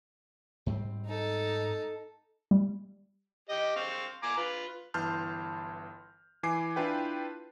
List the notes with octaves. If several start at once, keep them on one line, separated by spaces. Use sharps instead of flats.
G#2 G3 C4
D#4 A4
G3
G4 D#5
C4 F5 C#6
G#5 A#5 D6
F4 B4
G1 E3 A5 C6 F6 G6
E3 G#5 D6 C7
D4 E4 F4 B4 G5